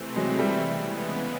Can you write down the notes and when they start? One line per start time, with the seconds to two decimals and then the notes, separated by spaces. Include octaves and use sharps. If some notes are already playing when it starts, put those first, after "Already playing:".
Already playing: C3 E3 A3 C4
0.16 F#3 G#3
0.39 G3 A3
0.61 C#3 E3 G#3 B3